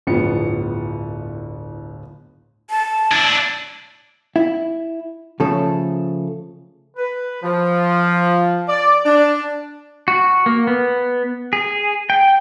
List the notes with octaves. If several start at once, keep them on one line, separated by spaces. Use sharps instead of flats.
D1 G1 A2 F3 B3 C#7
A5
D4 E4
E4
C#3 F3 A3 A4
B4
F3
D5
D4
F#4
A#3
B3
G#4
G5